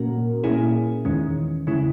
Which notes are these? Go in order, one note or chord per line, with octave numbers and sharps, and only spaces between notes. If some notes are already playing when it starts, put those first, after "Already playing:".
Already playing: A#2 A#3 C#4 F#4 A#4
A#2 A#3 C#4 E4 G#4
E2 D#3 G#3 C#4
C#3 G#3 C#4 E4